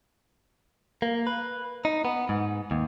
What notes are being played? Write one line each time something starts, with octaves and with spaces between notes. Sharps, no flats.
A#3
B4
D#4
B3
G#2
D#2